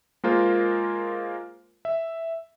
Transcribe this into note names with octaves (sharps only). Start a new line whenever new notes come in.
G#3 A#3 F4 A#4 C5
E5